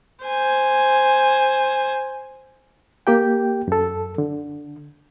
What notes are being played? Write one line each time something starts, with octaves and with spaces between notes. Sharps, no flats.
C5 G#5
A#3 G4 G5
F#2 A4
D3